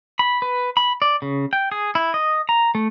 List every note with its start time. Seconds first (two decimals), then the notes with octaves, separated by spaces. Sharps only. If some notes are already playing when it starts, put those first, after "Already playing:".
0.19 B5
0.42 B4
0.77 B5
1.02 D5
1.22 C#3
1.53 G5
1.72 G#4
1.95 E4
2.14 D#5
2.49 A#5
2.75 A3